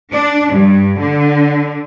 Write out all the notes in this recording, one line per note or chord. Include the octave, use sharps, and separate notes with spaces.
D4
G2
D3